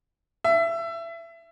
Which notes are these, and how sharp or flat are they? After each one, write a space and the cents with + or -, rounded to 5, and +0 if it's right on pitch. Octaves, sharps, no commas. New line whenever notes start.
E5 +20